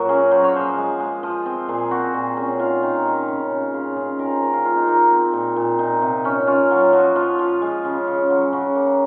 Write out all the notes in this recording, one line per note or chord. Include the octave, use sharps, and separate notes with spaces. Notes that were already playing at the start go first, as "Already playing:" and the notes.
Already playing: A#2 F#3 A#3 F#4 A#4
C#4 G#4
F#3 C5
C#5
F3 C5
G#3
G#3
F3
C4 C5
A#2 G#4
C4 F#4
A#2
C#4 G#4
D#3 F4
D#3 D#4
F4
D#3 D#4
C#3
C#3
C#3 F4
C#3 G#4
D#3 A#4
C5
D#3 A#4
F4
A#3 F4
D#4
A#3 D#4
F4
C4
A#2
A#2
A#2 D#4
C3
C#4
C#4 F4
F#3
F3 F#4
F3 F4
F3
G#3
C#3
C#3
F#3
C#3 F#4
A#3